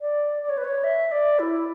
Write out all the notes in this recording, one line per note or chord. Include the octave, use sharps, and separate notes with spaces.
D5
D5
C#5
B4
C#5
E5
D5
E4